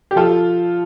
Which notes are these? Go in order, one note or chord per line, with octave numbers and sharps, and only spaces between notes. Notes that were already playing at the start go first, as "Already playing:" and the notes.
G4
F3 F4 A4